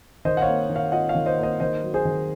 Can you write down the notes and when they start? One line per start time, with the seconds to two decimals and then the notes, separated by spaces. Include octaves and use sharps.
0.25 D#3 C5 D#5
0.37 F#5
0.42 C#5 F5
0.47 A#3
0.69 D#3
0.76 C#5 F5
0.92 F4 D#5 F#5
1.09 C#5 F5
1.15 D#3
1.26 C5 D#5
1.38 A#3
1.43 C5 D#5
1.60 D#3 C5 D#5
1.83 F#3
1.94 G#4 C5
2.05 D#3